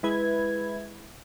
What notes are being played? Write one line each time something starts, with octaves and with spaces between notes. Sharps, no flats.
G#3 E4 B4 G#6